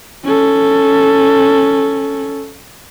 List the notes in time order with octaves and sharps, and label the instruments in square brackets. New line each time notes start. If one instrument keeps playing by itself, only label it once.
[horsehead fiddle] C#4 A4